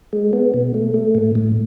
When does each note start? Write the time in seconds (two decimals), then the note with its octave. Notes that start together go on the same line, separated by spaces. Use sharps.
0.13 G#3
0.33 B3
0.54 B2
0.74 A3
0.94 A3
1.15 A2
1.35 A2